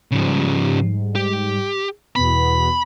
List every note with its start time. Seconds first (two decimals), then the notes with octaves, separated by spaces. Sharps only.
0.12 G#2 C#3 F3 G3
1.15 G4
2.16 E2 B2 B3 B5